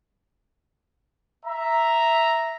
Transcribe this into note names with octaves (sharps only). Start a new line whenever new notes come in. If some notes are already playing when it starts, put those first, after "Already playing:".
E5 A#5